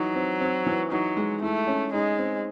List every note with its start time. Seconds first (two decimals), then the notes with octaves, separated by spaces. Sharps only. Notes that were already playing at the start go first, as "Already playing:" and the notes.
Already playing: E3 F#3 D#4
0.15 C4
0.40 C4
0.66 E3
0.91 F#3 D#4
1.17 G#3
1.42 A3 E4
1.67 C#4
1.93 G#3 D#4
2.18 C4